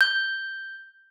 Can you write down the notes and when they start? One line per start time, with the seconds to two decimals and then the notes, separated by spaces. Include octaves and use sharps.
0.01 G6